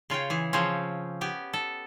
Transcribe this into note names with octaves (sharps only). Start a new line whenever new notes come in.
C#3 F4 C#5 G5
E3 G#4
C#3 F3 C4 C#4
B3 G4 G#5
A4